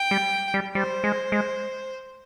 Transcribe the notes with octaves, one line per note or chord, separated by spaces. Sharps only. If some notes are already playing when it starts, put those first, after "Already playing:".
Already playing: G5
G3
G3
G3 C5
G#3
G#3